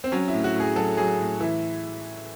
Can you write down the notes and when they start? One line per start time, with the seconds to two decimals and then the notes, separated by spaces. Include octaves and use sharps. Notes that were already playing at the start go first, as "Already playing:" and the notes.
0.04 C4
0.12 F#3 C#4
0.28 E4
0.33 A2
0.44 F#4
0.55 A2 G#4
0.76 F#3 A4
0.97 F#3 G#4
1.19 A2
1.40 E3 E4